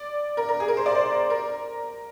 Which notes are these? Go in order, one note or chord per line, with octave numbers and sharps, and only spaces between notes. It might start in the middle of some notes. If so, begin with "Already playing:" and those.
Already playing: D5
A#4
A#4
G#4
A#4
C5
D5
C5
A#4